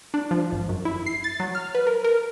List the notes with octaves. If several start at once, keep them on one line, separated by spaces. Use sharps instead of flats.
D4
F3
G#1
F#2
E4
C7
A6
F#3
F6
B4
A#4
A#4